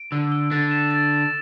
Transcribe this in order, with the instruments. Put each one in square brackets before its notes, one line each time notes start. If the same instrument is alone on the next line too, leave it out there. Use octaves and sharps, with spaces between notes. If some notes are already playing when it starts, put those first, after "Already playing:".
Already playing: [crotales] D7
[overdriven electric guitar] D3 [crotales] E6
[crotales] E6
[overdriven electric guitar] D3 [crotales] A6
[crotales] E7
A6